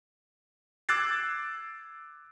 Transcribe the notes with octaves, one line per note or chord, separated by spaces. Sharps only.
D6 E6 F#6 G#6 A6 C7